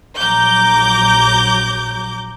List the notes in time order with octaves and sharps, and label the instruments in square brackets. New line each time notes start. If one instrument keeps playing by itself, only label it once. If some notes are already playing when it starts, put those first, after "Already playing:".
[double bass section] A#1 F#3 [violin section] A#5 D6 G6